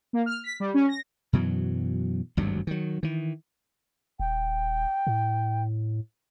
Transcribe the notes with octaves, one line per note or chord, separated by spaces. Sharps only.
A#3
F6
B6
G3
C#4
A#6
F#2 B2 E3 F#3
G#1 D2 G2 F#3
D#3 F#3
D#3 E3
D#1 G5
A2